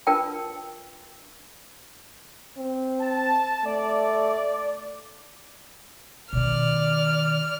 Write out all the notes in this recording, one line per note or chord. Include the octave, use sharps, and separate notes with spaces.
D4 F4 A#4 B4 G5 A5
C4
A5
A3 D5
B2 D#3 D5 F6